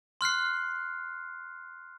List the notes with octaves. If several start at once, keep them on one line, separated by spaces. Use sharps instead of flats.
C6 F6 F#6 C7